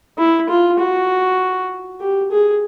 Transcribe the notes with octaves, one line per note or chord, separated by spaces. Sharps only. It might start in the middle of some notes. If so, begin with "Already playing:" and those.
E4
F4
F#4
G4
G#4